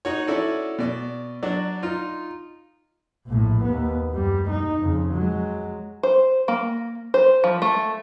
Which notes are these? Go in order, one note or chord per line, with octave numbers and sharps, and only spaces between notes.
D#4 F#4 C#5
C#4 E4 F#4 A4 D5
B2 D5
F#3 D4 F#4
D#4 F4
A#1 A2
D#2 B3
F#2 G3
D#4
F2 C#3
F#3 G#3
C5
A#3
C5
F3
A3